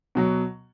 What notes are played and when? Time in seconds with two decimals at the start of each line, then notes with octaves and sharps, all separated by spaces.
0.15 B2 F#3